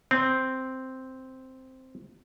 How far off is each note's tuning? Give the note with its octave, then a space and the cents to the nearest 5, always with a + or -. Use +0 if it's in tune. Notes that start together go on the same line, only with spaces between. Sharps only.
C4 -5